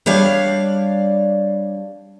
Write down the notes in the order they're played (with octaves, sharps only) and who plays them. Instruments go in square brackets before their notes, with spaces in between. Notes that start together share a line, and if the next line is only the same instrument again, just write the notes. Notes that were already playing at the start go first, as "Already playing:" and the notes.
[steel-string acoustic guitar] G3 D4 C#5 D5 F5